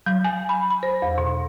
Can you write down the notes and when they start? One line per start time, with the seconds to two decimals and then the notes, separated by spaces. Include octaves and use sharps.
0.06 F#3
0.25 G#5
0.49 B5
0.70 B5
0.83 C5
1.02 E2
1.18 B2